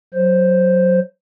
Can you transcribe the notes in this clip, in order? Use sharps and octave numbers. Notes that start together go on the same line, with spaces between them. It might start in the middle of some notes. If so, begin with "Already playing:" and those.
F#3 C5